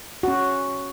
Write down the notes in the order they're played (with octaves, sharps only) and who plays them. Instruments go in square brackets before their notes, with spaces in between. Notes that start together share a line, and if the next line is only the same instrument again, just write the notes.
[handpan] C#4 F#4